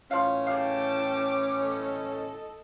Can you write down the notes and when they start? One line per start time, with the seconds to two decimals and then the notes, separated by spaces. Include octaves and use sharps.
0.11 A2 E3 F3 C#4 F5
0.47 G#4 F5 G5 A5 D6
1.59 A4 D#5